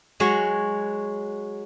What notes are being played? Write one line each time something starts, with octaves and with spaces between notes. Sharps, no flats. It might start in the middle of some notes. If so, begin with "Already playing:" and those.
F#3 G#3 F#4 C#5